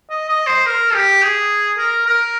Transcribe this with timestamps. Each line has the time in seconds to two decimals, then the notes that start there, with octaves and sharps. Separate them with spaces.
0.10 D#5
0.29 D#5
0.46 C5
0.66 A#4
0.94 G4
1.22 G#4
1.78 A#4
2.06 A#4